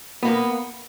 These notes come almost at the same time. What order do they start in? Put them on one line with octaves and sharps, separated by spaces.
B3 A#3 B4